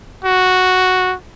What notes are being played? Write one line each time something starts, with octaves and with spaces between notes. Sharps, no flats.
F#4